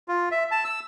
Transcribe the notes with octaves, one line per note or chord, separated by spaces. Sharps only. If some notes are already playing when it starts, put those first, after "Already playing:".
F4
E5
A5
E6